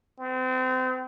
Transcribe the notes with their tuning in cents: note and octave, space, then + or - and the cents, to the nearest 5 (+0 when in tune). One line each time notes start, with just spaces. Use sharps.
C4 -35